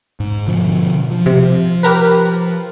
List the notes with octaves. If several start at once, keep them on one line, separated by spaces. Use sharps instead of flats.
G#2
B2 D3 F3
F3
C3
G4 A#4 B4